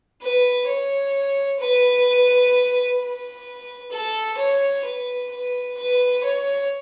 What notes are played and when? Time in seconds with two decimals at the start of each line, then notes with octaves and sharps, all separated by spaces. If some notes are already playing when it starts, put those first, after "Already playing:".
0.22 B4
0.67 C#5
1.59 B4
2.98 B4
3.91 A4
4.37 C#5
4.84 B4
5.31 B4
5.77 B4
6.23 C#5